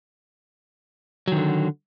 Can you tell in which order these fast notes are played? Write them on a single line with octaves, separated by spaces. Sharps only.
F#3 D#3 D3